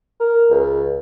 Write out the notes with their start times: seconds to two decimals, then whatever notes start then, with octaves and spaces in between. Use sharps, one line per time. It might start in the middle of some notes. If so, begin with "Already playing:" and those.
0.20 A#4
0.51 C#2